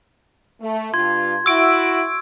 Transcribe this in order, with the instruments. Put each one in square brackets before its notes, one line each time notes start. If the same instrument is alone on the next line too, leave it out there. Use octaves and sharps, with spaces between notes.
[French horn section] A3
[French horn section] G2 F4 [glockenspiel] C6 G#6
[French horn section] E4 F#4 [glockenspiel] C#6 [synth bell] E6 D7